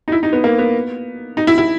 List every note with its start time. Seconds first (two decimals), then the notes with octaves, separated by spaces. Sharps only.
0.08 D#4
0.12 E4
0.23 D#4
0.33 B3
0.44 A#3
0.58 B3
1.37 D#4
1.47 E4
1.58 E4